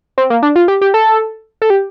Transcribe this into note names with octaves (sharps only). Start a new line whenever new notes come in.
C4
A#3
D4
F4
G4
G4
A4
A4
G4